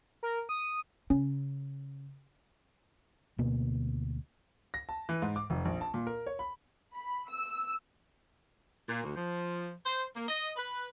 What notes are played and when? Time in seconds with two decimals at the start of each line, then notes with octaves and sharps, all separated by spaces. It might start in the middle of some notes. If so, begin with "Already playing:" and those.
0.23 A#4
0.49 D#6
1.10 C#3 C#4
3.38 D2 B2 A#3 B3
4.74 A#6
4.89 A5
5.09 E3
5.22 G#2
5.36 D6
5.50 F1
5.65 A#1
5.81 A5
5.94 A#2
6.07 A#4
6.26 C#5
6.39 B5
6.94 B5
7.29 E6
8.88 A#2
9.04 D2
9.15 F3
9.86 C5
10.15 A#3
10.28 D#5
10.57 B4